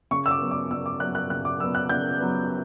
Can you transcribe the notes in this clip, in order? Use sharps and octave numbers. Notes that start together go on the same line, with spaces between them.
C#3 C#6
E6
D6
F#3 B3
D6
C#3 E6
D6
F#3 B3 F#6
F#6
C#3 F#6
D6
F#3 B3 E6
F#6
C#3 G6
F#3 B3